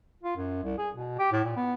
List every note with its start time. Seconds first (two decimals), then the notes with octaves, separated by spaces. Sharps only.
0.23 F4
0.37 F#2
0.63 C2
0.78 G#4
0.95 B2
1.19 G4
1.32 A2
1.44 A#2
1.56 B3